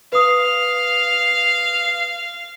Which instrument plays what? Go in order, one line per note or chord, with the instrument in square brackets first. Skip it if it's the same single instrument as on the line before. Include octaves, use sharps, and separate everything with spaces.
[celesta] B4 D#6 [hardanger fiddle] F5